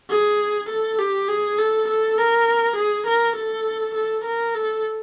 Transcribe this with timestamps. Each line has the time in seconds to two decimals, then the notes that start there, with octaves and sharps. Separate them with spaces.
0.10 G#4
0.69 A4
0.99 G4
1.29 G#4
1.59 A4
1.88 A4
2.18 A#4
2.76 G#4
3.07 A#4
3.36 A4
3.95 A4
4.25 A#4
4.55 A4